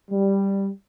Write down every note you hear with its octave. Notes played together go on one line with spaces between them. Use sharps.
G3